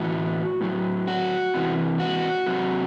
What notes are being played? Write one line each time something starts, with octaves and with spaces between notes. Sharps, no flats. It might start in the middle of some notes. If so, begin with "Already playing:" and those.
Already playing: A2 E3 F#4
A2 F#3
F#4
C3 E3
F#4
C3 F#3